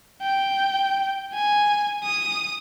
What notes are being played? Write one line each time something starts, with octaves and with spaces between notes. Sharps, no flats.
G5
G#5
D#6